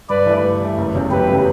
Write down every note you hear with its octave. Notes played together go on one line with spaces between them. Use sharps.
G2 B4 D5
E3 A3
G2
E3 A3
F#1
E2 C#3 F#3 A3
F#1 G4 B4
C#3 F#3 A3